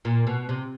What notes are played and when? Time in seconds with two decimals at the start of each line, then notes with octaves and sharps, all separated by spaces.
0.05 A#2
0.27 B2
0.49 C3